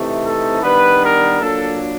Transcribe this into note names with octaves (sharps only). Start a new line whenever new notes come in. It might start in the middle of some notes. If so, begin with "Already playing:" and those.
Already playing: C3 E3 A3 C4 D#4
A4
D#3 G3 B3 D4 B4
A#4
A#2 F#3 A#3 D4 A4